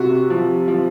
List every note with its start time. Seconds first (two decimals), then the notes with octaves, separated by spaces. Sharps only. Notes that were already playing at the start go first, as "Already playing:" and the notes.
Already playing: C3 F#4
0.30 F3
0.68 F3